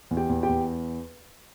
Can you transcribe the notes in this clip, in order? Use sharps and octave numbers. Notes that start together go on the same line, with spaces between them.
E2
G4 G5
E2
G4 G5
E2